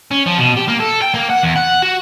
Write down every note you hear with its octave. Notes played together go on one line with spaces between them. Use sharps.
C#4
F3
B2
G4
A#3
A4
G5
A#3
F#5
E2
F#5
F#4